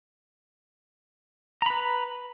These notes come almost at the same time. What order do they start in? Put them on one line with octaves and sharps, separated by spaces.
A#5 B5 B4